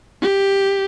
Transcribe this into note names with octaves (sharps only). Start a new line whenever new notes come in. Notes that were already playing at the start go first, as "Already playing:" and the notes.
G4